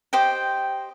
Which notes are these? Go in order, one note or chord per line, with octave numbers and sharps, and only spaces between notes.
G4 C5 D#5 G5